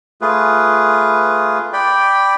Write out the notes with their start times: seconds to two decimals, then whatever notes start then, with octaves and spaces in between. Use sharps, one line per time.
0.21 A3 F4 G#4 B4
1.73 D5 G5 B5